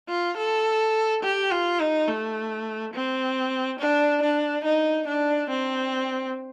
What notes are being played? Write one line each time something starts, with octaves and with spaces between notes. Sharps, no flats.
F4
A4
G4
F4
D#4
A3
C4
D4
D4
D#4
D4
C4